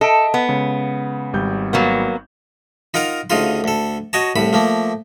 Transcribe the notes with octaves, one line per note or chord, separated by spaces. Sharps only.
A4 D#5 E5 D7
B3
C#3 G#3
G#1 G3 G6
F#3 A#3 B3
D#4 F4 A#4 F#5 A#5
D2 C#3 D#4 F4 C6
D2 A4
F#4 C#5 D#5 A5
C2 A2 B5
F3 A3 A#3